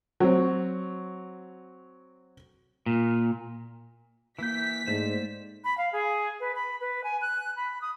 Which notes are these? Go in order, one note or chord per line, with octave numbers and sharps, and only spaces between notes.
F#3 C4
A#2
E3 A#3 E4 G6 B6
G#2 A3 C5 D5
B5
F5
G#4
B4
B5
B4
G#5
F#6
B5
D#6